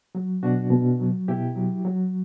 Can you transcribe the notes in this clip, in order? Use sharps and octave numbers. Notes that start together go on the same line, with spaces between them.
F#3
B2 D4 F#4
B2
F#3
B2 E4 G4
F#3
F#3